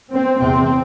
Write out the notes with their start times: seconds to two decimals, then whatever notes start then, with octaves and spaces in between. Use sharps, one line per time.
0.10 C4
0.39 E2 C3 C4